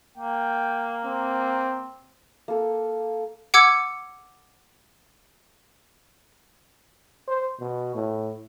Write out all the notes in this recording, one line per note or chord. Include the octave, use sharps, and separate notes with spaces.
A#3 G5
C4
A#3 A4
F#5 D6 E6 G#6 C#7
C5
B2
A2